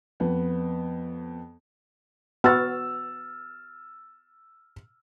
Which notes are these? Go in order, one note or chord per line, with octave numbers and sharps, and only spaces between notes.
F2 B3
B3 F#4 E6 F6 A6